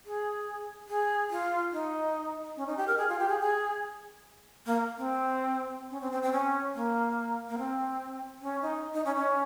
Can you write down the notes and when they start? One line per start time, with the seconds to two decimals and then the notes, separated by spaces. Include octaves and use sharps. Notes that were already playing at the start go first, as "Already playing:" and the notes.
0.05 G#4
0.89 G#4
1.30 F4
1.72 D#4
2.57 C#4
2.67 D#4
2.77 G4
2.88 A#4
2.98 G#4
3.09 F4
3.19 G4
3.29 G#4
3.40 G#4
4.66 A#3
4.97 C4
5.90 C#4
6.01 C4
6.12 C4
6.23 C4
6.32 C#4
6.75 A#3
7.49 A#3
7.58 C4
8.41 C#4
8.62 D#4
8.94 D#4
9.05 C#4
9.16 C#4